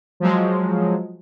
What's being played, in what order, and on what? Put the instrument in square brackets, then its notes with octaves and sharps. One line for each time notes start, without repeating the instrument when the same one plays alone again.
[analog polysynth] F3 F#3 G#3